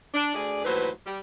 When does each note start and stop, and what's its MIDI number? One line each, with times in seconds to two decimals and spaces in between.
0.14 0.33 62
0.35 0.63 38
0.35 0.63 68
0.35 0.63 74
0.64 0.90 39
0.64 0.90 45
0.64 0.90 52
0.64 0.90 54
0.64 0.90 71
0.64 0.90 72
1.07 1.18 55